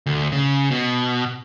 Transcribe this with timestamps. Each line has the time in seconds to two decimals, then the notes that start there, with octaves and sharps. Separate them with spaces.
0.06 D2
0.32 C#3
0.71 B2